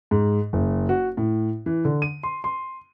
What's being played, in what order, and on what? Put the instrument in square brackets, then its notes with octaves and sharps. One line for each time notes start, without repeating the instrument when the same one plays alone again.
[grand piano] G#2
F#1
F#4
A2
E3
D3
D#7
C6
C6